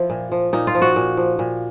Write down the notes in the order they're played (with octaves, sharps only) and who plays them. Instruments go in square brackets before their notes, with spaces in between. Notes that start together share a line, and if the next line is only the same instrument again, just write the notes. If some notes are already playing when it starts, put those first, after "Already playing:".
Already playing: [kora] F3 E4
A#2
F3
A#2 D#4
F4
F3
F#4
A#2
F3
A#2